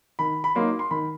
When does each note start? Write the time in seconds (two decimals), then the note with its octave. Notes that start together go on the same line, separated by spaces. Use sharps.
0.19 D#3 B5
0.44 B5
0.55 F#3 A#3 D#4 C6
0.79 C6
0.91 D#3 B5